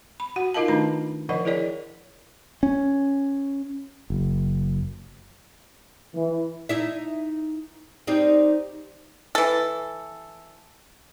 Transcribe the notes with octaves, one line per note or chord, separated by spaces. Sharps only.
B5
F#4 F#5
D#4 F4 A#4 D#5 F5 A5
D#3 A3 D4 D#4 A#5 B5
D3 F3 A#4 C#5 D#5 F#5
E4 G#4 A#4 C#5 D5
C#4
F#1
E3
D#4 E4 E5
G3 C4 D#4
E3 A4